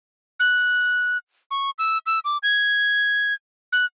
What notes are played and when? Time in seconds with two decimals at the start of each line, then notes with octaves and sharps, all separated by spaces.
0.40 F#6
1.51 C#6
1.79 E6
2.06 E6
2.25 D6
2.43 G#6
3.72 F#6